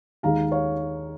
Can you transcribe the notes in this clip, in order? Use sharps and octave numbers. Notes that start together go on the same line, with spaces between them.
D#2 D#3 G#3 F5 A#5
C#5 F5